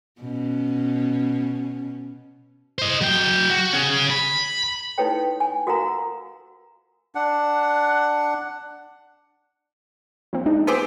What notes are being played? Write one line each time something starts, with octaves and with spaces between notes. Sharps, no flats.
B2 C#4
C5 D#5
F#3 G5
F#4
C#4 G#4
B5
D#4 E4 A4 B4 C#5 G5
G#5
F#4 A4 A#4 F5 F#5 A#5
D4 F#5
F3 A#3 C4
G#3 D4 D#4
B3 C4 G4 G#4